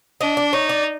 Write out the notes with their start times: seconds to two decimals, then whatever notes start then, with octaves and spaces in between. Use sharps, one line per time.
0.20 D4 D#5
0.37 D5
0.53 D#4 C#5
0.69 D5